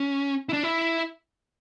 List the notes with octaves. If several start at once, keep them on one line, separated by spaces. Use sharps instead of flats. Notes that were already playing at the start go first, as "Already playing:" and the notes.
Already playing: C#4
E4
D4
E4